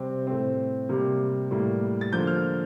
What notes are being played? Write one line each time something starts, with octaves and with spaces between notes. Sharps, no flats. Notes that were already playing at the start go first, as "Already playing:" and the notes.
Already playing: C3 G3 C4
A2 A3 C4
C3 G3 A#3
A2 G3 A#3
A6
D3 F3 A#3 G6
F6